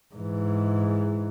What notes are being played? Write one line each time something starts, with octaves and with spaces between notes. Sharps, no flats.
G#2 E3